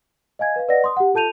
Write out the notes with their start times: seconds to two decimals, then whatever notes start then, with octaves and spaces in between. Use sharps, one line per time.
0.39 D#5 F5 G#5 G#6
0.56 B4 F5
0.69 B4 D5 D#5 F#5 A#6
0.84 C6 D#6
0.97 G4 F#5
1.14 F4 A4 A5 G6 D#7 F7